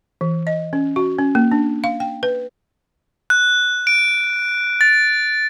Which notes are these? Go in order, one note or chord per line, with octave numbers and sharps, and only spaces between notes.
E3
D#5
C#4
F#4
C#4
A#3
D4
F5
G5
B4
F#6
D7
A6